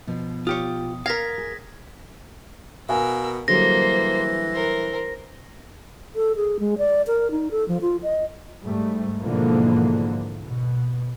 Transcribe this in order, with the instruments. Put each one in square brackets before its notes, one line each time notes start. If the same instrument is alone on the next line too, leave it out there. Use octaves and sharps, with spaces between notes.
[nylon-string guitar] B2 F3
[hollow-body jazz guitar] F4 G4 C#5 [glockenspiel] D#6
[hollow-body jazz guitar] A#4 F5 [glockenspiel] G#6 A#6 B6
[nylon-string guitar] G#4
[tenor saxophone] B2 [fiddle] A#4 E6 [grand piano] F5 G#5
[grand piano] D3 F#3 G3 [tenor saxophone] E3 [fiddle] A#3 C5 [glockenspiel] A#6
[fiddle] A#4 C5
[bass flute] A4
G#4
G#3
D5
A#4
D#4
A4
F3
F4
D#5
[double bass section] G#2 G3 A3
G#2 B2 D3 E3 F3 A#3
B2